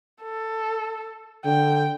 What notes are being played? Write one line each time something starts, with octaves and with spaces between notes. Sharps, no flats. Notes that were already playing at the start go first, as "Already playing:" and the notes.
A4
D3 G5